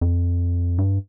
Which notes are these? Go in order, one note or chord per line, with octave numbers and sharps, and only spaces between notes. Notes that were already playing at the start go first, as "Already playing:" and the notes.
F2
G2